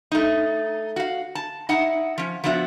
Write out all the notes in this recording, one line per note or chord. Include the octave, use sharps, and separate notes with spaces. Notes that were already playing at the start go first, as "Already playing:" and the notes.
A3 D#4
F#4 F5
A5
D#4 E4 F#5
F3 C#4
F3 B3 D4 F#4 E5